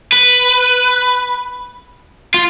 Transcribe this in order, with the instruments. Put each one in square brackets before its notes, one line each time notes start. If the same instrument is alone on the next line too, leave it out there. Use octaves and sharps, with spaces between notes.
[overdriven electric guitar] B4
F4